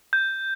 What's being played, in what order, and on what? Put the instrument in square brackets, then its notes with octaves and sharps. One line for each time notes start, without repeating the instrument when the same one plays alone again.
[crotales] G6